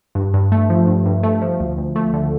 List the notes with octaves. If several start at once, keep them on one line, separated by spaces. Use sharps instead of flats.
G2
G2
A3
F3
G2
G2
A3
F3
D2
D2
A3
D3